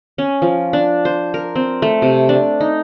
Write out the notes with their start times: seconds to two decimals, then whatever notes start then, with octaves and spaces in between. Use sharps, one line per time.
0.18 C#4
0.42 F3
0.73 D4
1.05 C5
1.34 A#4
1.55 C4
1.82 A3
2.02 C3
2.29 D4
2.60 D#4